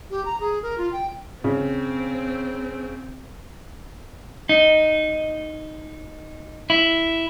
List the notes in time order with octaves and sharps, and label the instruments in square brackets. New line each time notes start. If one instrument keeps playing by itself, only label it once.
[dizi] G4
A#5
G#4
A#4
F4
G5
[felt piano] C#3 [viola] C4
[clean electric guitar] D#4
E4